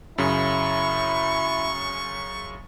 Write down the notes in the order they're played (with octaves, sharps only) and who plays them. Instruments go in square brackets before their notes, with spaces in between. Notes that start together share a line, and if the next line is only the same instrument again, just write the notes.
[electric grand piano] F#2 C#3 [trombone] E4 [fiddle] C#6